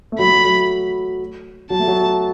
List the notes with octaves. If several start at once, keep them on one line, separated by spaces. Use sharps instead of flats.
A3
F#3 B5
A3
F#3
F#3
F#3 A5
A3
F#3